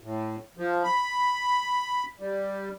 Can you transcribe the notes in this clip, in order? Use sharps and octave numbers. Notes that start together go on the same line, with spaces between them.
A2
F3
B5
G3